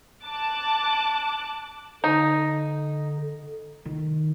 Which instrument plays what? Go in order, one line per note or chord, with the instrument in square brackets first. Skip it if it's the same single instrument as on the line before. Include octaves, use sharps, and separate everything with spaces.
[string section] A5 D6 F#6
[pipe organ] D3 [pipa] D#4
[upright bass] D#3